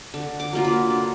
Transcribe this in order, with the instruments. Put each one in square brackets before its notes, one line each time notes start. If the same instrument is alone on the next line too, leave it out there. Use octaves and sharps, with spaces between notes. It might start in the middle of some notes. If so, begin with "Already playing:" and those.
[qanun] D3
D6
F#3 A#3 F4
B5
D3